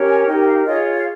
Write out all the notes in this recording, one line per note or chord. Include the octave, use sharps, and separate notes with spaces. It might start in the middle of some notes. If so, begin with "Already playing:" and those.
Already playing: C#4 G4 A#4 C#5
G#5
D#4 G4 A#4 G5
G5
F5
F4 G#4 C#5 D#5
F5